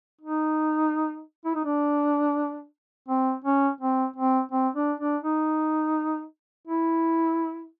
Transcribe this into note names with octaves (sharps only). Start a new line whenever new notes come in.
D#4
E4
D#4
D4
C4
C#4
C4
C4
C4
D4
D4
D#4
E4